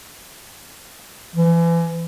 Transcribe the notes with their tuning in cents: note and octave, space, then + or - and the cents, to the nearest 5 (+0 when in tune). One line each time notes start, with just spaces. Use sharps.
E3 +35